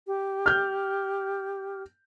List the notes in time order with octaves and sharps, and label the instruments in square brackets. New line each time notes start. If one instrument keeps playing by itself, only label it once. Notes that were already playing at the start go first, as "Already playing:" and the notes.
[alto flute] G4
[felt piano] F6 G6